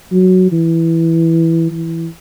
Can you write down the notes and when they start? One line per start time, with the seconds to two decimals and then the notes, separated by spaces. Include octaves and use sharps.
0.12 F#3
0.52 E3
1.71 E3